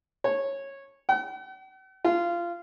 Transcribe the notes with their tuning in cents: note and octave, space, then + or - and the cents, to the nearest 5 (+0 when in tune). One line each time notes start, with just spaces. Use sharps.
C#5 -15
F#5 +45
F4 -20